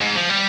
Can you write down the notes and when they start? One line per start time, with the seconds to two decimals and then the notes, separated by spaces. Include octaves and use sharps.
0.01 G#2
0.16 F3
0.30 G3